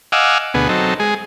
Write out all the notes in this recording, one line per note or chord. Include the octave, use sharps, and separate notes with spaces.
D#5 F5 F#5 G#5 D6 E6
D2 B2 B3 G#4
F#3 C4 D#4 A4
G#3 G#4